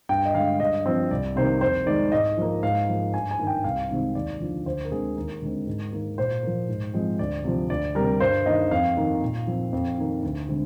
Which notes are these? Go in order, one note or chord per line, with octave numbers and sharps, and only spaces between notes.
G2 G5
D#5
D3 G#3 F5
G2 D#5
F3 C4
C2 D5
C3 D#3 A#3 C5
F2 C5
D#3 G#3 C4 D5
G#2 D#5
F3 A#3
G#2 F5
F3 A#3
G2 G#5
G#5
D#3 A#3
G5
C2 F5
C3 D#3 G#3 C4
D#2 D5
D3 F3
D2 C5
A#4
D3 G#3 C4 G#4
D#2 A#4
D3 G#3 C4
G#2
D#3 A#3
A#2 C5
F3 A#3
G#2
F3 G#3 C4
D2 D5
C3 F3
D2 D5
C3 G3 A#4
G2 C5
D#3 A#3 D#5
F2 F5
D#3 A#3
A#2
F3 C4
F2
D#3 A#3
D2
D3 G#3 C4